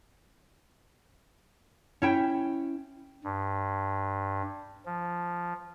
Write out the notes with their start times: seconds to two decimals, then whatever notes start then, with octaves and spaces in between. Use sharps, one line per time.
2.02 C#4 E4 G5
3.24 G2
4.86 F3